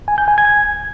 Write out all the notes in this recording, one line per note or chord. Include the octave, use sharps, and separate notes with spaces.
G#5
G6
G#5
G#6